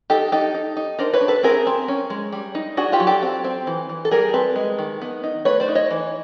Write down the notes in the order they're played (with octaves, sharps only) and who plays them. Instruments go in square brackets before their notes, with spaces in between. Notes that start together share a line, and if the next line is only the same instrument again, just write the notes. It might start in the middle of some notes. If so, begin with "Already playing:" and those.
[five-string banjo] D#4 G4 A4
D#4 G4 A4
D#4
D#4
D4 A#4 C5
B4 C#5
D4
A4 B4
C4 G#4 A#4
C4
C#4
G#3
G3
D#4
D4 F#4 G#4
F4 G4
F#3
G4 A4
C4
C4
E3
E3
A4
G3 G#4 A#4
C4 A4 B4
G#3
D#3
B3
D#4
A3 B4 C#5
C5 D5
D#4
C#5 D#5
E3